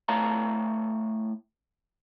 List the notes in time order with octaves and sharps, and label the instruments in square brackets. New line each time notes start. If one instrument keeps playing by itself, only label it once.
[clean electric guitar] A2 A3 C#5 F5 A5 A#5